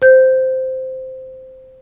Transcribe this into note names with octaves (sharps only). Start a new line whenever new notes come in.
C5 G6